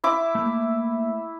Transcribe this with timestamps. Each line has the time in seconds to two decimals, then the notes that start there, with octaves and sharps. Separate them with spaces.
0.04 E4 D6
0.35 A3 A#3